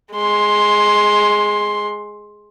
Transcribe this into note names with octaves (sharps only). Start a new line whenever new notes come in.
G#3 C6